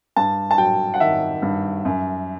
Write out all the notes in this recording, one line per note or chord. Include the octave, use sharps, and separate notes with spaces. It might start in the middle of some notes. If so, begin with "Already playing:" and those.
G2 A5
A5
F#3 G5
F#5
D#3 E5
G2
F#2